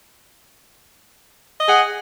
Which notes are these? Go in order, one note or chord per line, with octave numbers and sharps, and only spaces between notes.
G#4 D#5 F#5